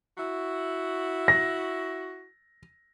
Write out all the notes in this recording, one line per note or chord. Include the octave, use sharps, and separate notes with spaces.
E4 F#4
A#6